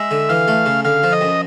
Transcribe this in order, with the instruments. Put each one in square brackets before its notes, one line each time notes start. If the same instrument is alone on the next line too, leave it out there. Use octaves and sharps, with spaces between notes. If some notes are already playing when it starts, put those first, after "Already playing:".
Already playing: [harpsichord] G#3 [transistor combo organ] E5
[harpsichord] D3
[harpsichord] E3 [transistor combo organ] F5
[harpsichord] A3
C#3
[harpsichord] D3 [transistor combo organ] F5
[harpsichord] F3
[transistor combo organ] D#5
[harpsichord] F#2